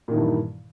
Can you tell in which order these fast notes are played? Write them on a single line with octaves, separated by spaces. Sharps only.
A#2 D#3 E3 G2